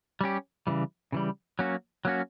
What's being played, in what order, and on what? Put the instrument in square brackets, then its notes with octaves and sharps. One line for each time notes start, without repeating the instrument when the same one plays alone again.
[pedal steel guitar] G3 C#4 G4
C#3 E3 G3
C#3 E3 G3
F#3 A#3 C#4 F#4
F#3 A#3 C#4 F#4